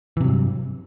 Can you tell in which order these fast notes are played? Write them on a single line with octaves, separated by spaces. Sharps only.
E3 C3 F#3 G2